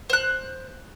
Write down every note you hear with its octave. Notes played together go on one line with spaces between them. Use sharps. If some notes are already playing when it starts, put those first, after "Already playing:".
C5 F#6